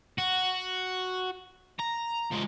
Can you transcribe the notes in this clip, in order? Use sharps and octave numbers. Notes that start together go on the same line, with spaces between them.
F#4
A#5
F3 G#3